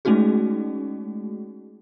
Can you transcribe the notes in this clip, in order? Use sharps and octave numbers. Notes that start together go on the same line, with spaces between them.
G#3 A3 C#4 D#4 F#4 G#4